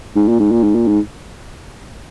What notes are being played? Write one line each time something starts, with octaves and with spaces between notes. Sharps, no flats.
G#2
A#2
G#2
A#2
G#2
A#2
G#2